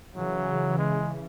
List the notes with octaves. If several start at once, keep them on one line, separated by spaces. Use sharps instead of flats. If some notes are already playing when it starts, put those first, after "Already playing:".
C#3 E3 F#3
G#3